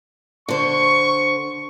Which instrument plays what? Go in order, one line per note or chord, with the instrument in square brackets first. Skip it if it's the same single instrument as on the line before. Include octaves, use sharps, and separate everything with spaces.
[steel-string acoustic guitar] D3 C5 [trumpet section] C#6